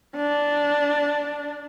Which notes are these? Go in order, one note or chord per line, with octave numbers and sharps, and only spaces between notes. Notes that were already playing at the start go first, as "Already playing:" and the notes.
D4